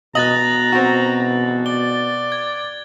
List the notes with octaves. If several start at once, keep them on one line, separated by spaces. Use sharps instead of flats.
B2 D#5 A#5 F#6 A6 F#7
C4 F#4
D5 G7
G#6